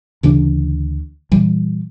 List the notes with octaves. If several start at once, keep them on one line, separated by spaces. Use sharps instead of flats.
D2 C#3 E3 D4
A#2 E3 G3